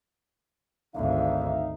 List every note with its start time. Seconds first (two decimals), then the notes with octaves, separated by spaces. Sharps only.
0.95 G#1 D2 D#4 E5 F5